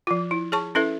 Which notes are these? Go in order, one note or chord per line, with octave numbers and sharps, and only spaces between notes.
F3 F4
E4
G#4 C#5 A5 C#6
C#4 E4 A4 B4 E5